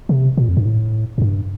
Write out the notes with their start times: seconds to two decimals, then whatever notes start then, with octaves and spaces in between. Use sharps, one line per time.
0.09 C3
0.37 A#2
0.49 F2
0.57 G2
0.65 A2
1.18 F2
1.22 G2